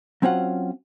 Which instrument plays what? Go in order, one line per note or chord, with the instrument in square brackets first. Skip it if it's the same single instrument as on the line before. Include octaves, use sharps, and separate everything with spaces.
[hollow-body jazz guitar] F#3 C4 C#4 F4 F#5